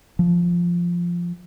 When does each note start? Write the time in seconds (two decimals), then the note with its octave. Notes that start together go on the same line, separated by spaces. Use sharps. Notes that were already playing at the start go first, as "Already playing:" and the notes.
0.19 F3